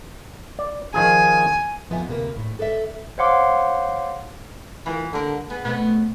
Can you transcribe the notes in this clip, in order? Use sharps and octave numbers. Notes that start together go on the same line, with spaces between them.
D5
D#3 F3 G#4 G#5
F2 F3 B3 F4 E5 G#5
D2 C3 A#3 E4 A#4 B4
A2
A4 B4 D5 E5
C5 C#5 F5 F#5 C6 D6
E3 F4 A#4
D3 G3 A#4
B3 G#4
B2 A3 B3 C4